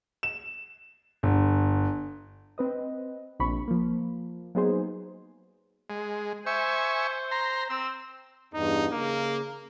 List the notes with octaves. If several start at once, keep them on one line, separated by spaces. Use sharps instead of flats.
E7
G1
C4 B4 D#5
A#1 C3 B5 C#6
F3 A#3
F#3 A#3 B3 D#4 G#4 C5
G#3
C5 E5 G#5 C#6
A#5 C6
C4 E6
E2 G2 D#4
C#3 A#3